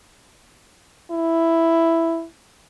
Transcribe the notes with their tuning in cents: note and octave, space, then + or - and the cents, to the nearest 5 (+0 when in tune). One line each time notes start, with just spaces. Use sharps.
E4 +5